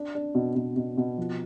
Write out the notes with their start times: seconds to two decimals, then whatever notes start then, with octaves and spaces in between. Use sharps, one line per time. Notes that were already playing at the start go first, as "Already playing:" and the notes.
Already playing: D4
0.15 D4
0.35 B2
0.55 B2
0.76 B2
0.97 B2
1.18 F3